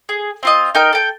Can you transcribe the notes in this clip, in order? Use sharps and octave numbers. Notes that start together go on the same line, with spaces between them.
G#4
C4 F4 D#5
D#4 A#4 G5 F6
A4 G5